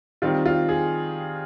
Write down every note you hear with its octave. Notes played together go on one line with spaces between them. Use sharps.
D#3 G3 C4 F4
F4
G#4